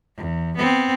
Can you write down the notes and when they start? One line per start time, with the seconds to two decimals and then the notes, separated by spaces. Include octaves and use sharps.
0.16 E2
0.57 B3 C4